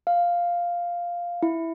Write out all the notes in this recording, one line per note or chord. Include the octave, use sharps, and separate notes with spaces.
F5
E4